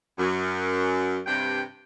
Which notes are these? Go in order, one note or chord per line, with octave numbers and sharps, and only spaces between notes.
F#2
G2 C3 G5